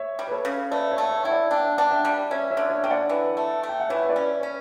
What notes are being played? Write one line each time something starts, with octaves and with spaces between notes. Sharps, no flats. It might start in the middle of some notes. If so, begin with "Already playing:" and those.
Already playing: C#5 E5
G3
B4
A4 C#5
C#3
A3 B4 D5
C#5 E5
A3 F#5
C#5 E5
E4 G5
D5 F#5
D4 E5 G5
E5
D4 F#5
E5 G5
G3
C#4 C#5 E5
C#5 E5
D3
D5
C#5 E5
D3 G5
D5 F#5
E3
A3
A3
G5
F#5
E3 C#5 E5
E5
B4 D5
C#4
C#4 C#5